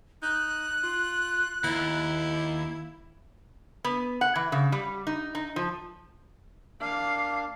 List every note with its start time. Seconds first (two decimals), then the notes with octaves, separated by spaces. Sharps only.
0.23 D#4 F#6
0.83 F4
1.64 D#2 E4
3.85 B3
4.21 F#5
4.35 E3
4.52 C#3
4.72 G3
5.07 D#4
5.35 D#4
5.56 F3
6.81 A#3 D4 F5